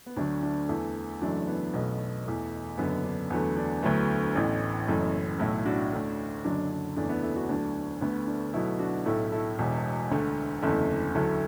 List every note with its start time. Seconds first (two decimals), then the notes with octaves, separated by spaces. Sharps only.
0.06 B3
0.16 D2 D3 F#3 A3 D4
0.43 D4
0.69 E2 E3 A3 E4 A4
1.21 F#1 F#2 E3 A3 D4 F#4
1.47 B3 E4
1.73 B1 B2 A3 B3
2.26 E2 E3 A3
2.78 F#1 F#2 D3 B3
3.04 D4
3.30 E2 D3 F#3 A3 B3
3.57 D4
3.82 D2 D3 F#3 A3 B3 E4
4.35 A1 A2 E3 A3
4.88 F#1 F#2 E3 A3
5.39 B1 A2 A3 E4 A4
5.66 D4 F#4
5.92 D2 D3 A3
6.44 F#1 F#2 D3 F#3 D4
6.71 D4
6.96 F#1 E2 E3 A3 D4
7.09 B3 E4
7.22 E4 A4
7.36 D4 F#4
7.49 D2 D3 F#3 D4
8.01 D2 D3 A3 B3
8.27 D4
8.54 B1 B2 F#3 A3 B3 E4
8.79 D4 F#4
9.05 B1 A2 A3 E4 A4
9.32 E4 A4
9.58 E1 E2 B2
10.11 D2 D3 A3
10.62 F#1 E2 D3 A3 E4 A4
11.15 D2 D3 F#3 A3 E4 A4